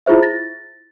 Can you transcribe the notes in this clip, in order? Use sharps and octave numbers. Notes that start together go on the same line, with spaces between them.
E4 F4 G#4 C5 E5
A6 A#6